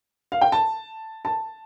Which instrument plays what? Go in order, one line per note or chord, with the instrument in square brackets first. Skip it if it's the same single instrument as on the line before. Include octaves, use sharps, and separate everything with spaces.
[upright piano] F5
G5
A5
A5